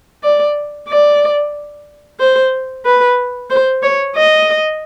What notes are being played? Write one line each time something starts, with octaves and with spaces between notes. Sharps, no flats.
D5
D5
C5
B4
C5
C#5
D#5